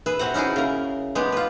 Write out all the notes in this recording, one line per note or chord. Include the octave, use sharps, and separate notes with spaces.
G#4 B4 E5
C3 C4 F#4 F#5
C#4 D#4 E4 F#4 G#4
C#3 A#4
G#3 B3 G4
F4 B4